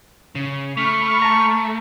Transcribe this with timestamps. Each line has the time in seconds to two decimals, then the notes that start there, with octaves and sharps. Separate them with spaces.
0.35 C#3
0.77 A3 B5 C#6 F6
1.22 A5 A#5